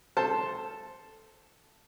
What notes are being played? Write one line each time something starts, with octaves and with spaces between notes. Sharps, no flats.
A4 C5 A5